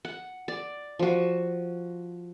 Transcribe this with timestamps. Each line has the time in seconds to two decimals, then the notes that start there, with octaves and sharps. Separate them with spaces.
0.05 F#5
0.48 D5
0.99 F3 F#4